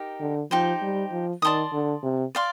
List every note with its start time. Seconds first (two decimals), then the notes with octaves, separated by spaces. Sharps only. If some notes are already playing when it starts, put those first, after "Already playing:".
Already playing: D#4 G4 A#4
0.21 D3
0.51 F3 D#4 G4 C5
0.82 G3
1.12 F3
1.42 D#3 D5 A5 C6 D#6
1.73 D3
2.03 C3
2.35 D5 F5 C6